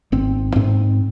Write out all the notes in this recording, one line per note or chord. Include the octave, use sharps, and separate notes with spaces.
G#1 C4
G#2 C4